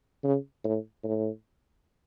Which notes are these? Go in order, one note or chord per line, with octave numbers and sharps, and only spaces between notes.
C#3
A2
A2